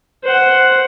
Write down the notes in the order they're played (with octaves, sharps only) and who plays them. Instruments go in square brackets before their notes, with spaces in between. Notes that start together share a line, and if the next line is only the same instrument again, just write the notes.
[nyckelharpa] C5 F#5